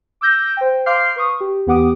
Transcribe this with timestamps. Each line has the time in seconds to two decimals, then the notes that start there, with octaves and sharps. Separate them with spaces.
0.21 D6 E6 G6 A#6
0.57 C5 G5
0.86 F5 C6 D6 F6 G6 C7
1.16 B4 C#6 D#6
1.41 G4
1.67 E2 B3 G4 F#5 D6 D#6